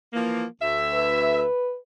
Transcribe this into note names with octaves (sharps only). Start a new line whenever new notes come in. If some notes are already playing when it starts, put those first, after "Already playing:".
E3 F3 A#3
D2 E5
B4